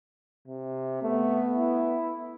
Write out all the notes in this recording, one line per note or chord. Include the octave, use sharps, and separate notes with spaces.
C3
A3 B3
E4